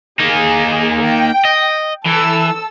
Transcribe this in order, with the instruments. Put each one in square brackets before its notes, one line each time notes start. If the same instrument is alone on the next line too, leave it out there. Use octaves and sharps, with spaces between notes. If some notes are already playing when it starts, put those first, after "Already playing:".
[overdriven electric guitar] A#3 D#4 [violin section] G#4
[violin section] G5
[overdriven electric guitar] D#5
[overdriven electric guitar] E3 [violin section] A4 E6